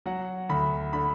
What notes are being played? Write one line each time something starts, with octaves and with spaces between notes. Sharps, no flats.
F#3 F#5
D2 B5
D3 B5